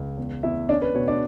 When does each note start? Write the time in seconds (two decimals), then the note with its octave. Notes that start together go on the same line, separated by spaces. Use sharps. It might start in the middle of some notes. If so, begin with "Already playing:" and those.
Already playing: C#2
0.17 E2
0.43 E2 E4 E5
0.69 C#4 D4 D5
0.82 B4
0.95 B2 C#5
1.08 D4 D5